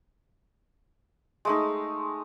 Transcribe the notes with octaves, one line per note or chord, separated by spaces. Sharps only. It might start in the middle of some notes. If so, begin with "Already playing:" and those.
G#3 A3 D#4